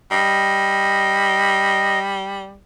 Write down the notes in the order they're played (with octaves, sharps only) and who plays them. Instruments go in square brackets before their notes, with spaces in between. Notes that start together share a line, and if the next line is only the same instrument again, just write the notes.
[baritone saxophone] G3 [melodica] D#5